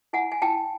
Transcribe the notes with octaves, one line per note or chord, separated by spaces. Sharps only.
E4 F#5 G#5
G#5
E4 G5 A5